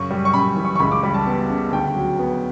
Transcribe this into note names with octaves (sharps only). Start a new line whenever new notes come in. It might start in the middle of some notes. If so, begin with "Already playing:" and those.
Already playing: F#2 C#3 C#6
G3
C#6
F#2 B5
E3
C#6
C#6
C#2 B5
D6
G3 B5
A5
B3
C#3
D2 G5
F#3
B3